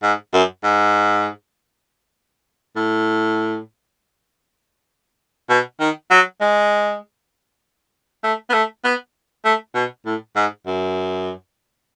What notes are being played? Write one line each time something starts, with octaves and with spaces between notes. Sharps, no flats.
G#2
F#2
G#2
A2
B2
D#3
F#3
G#3
A3
B3
A3
B3
A3
B2
A2
G#2
F#2